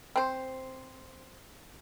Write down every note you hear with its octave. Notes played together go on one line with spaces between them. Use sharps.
C4 C5